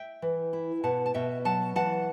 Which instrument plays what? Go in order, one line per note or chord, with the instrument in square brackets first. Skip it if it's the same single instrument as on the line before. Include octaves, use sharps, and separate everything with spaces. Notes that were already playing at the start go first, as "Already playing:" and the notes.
Already playing: [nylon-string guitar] E5 G5
E3
E4
B2 F#5 A5
A5
B2 E5 G5
F#3 F#5 A5
E3 F#5 A5